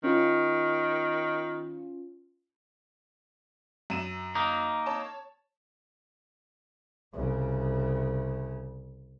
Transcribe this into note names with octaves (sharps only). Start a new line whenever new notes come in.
D#3 C#4 F4
F#2 D#7 E7
A#3 D#4
C#5 A5
C2 C#3